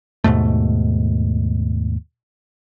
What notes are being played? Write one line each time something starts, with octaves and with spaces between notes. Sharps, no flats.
D#2 G#2 B2 A3